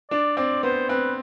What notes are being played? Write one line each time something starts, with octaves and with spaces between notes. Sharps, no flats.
D4 D5
C4 D5
B3 C5
C4 B4